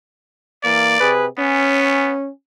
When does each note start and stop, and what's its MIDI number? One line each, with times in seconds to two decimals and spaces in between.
0.64 0.98 52
0.64 0.98 58
0.64 1.11 74
1.00 1.26 48
1.00 1.26 68
1.00 1.26 71
1.38 2.14 59
1.38 2.28 61